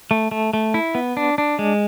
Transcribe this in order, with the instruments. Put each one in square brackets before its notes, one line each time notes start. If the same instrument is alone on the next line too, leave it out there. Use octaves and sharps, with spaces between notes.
[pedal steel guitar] A3
A3
A3
E4
B3
D4
D4
G#3